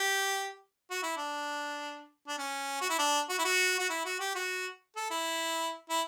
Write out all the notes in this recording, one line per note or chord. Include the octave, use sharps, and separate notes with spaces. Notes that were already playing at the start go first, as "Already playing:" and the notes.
Already playing: G4
F#4
E4
D4
D4
C#4
F#4
E4
D4
F#4
E4
F#4
F#4
E4
F#4
G4
F#4
A4
E4
E4